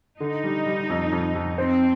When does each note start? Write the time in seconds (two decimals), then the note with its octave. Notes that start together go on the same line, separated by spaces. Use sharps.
0.20 D3 D#4
0.44 G3
0.66 G3
0.90 F2
1.12 F2
1.35 F2
1.58 C4 C5